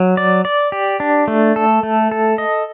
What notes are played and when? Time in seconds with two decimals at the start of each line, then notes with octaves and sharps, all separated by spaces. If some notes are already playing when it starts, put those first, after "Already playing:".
Already playing: F#3
0.17 D5
0.45 D5
0.72 G4
1.00 D4
1.28 A3
1.56 A4
1.83 A3
2.11 A4
2.38 D#5